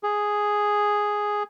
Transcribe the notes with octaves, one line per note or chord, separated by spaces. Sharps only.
G#4